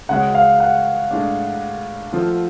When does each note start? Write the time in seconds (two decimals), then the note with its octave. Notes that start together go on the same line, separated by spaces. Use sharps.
0.09 C#3 G#3 C#4 F#4 F#5
0.35 F5
0.60 F#5
1.11 A2 G#3 D4
2.12 F3 A3 F4 A4